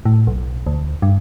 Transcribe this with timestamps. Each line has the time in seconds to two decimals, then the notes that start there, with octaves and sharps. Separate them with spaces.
0.05 A2
0.27 B1
0.67 D2
1.02 G2